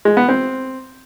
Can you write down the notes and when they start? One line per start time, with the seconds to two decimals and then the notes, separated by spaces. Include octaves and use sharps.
0.05 G#3
0.17 B3
0.29 C4